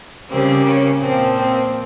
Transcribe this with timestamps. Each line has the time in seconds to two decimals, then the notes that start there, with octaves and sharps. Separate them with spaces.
0.29 C#3 G3 A#3 C4
0.64 C#4
0.99 A#2 F3 A#3 C4
1.35 C4